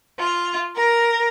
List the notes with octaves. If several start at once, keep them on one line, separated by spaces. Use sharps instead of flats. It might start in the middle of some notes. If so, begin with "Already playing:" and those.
F4
A#4